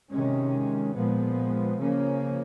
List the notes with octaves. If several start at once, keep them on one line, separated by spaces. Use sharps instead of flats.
C3 D#3 G#3 C#4
A#2 F3 G#3 B3
C#3 F3 A#3 C#4